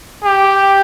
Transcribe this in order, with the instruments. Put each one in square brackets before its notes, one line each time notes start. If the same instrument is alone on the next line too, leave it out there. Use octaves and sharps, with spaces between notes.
[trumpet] G4